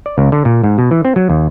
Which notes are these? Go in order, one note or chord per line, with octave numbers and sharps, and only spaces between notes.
D5
C#2
D3
A#2
G#2
B2
E3
C4
F#3
D#2